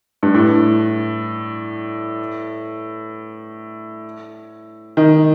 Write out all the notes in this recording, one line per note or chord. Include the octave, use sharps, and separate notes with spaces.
G2
A2
D#3